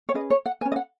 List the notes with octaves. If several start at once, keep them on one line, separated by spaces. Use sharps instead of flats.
C#5
C#4 G#4 B4 D#5
C#5
F#5
C#4 B4 G#5
D#5
F#5